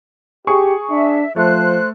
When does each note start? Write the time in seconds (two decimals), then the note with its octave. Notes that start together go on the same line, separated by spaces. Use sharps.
0.47 G4 G#4 C#6
0.90 D4 E5
1.36 F3 A3 C5 F#6